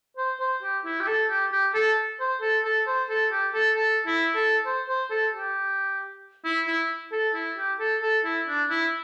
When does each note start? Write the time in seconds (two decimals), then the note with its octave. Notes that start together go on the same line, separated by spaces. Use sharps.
0.17 C5
0.40 C5
0.62 G4
0.85 E4
1.00 G4
1.07 A4
1.30 G4
1.52 G4
1.74 A4
2.20 C5
2.41 A4
2.64 A4
2.87 C5
3.09 A4
3.31 G4
3.54 A4
3.76 A4
4.06 E4
4.35 A4
4.66 C5
4.88 C5
5.10 A4
5.33 G4
6.44 E4
6.67 E4
7.12 A4
7.34 E4
7.57 G4
7.80 A4
8.02 A4
8.24 E4
8.47 D4
8.70 E4